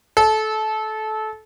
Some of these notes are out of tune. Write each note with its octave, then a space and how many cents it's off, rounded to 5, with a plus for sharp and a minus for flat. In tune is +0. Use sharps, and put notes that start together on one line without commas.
A4 -25